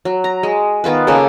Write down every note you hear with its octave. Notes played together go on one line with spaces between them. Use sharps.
F#3
A#5
G#3
D#3 B3 F4 B4
C#3 A#3 A4